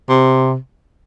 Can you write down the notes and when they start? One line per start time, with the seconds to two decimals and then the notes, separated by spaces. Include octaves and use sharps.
0.09 C3